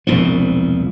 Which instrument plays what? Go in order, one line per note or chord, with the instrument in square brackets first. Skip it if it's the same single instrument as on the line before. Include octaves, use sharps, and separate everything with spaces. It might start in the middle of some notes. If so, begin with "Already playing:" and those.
[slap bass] E1 C2 A#2 F3